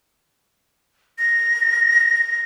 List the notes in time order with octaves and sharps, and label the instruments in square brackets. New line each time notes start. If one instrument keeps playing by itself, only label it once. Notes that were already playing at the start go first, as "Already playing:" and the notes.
[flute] A#6